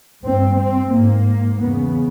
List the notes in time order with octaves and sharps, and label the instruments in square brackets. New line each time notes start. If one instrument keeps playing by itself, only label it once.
[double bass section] G2 C4
C4
G#2 A#3
E2 C#3 B3